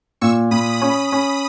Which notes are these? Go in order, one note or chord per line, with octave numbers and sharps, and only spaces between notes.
A#2 C#6 E6
A#2 B5 D#6
C#4 B5 D#6
C#4 B5 D#6